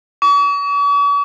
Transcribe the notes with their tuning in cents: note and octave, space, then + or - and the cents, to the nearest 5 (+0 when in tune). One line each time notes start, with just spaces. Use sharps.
C#6 +45